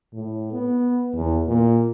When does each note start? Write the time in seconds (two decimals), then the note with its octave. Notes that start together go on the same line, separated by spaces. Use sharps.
0.13 A2
0.52 B3
1.14 E2
1.48 A#2